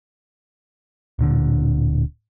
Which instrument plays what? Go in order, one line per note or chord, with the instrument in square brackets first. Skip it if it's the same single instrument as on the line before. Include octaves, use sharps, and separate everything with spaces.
[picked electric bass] D1 A#2 D3